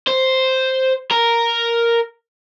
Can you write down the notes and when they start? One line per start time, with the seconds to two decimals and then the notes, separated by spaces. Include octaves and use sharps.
0.07 C5
1.11 A#4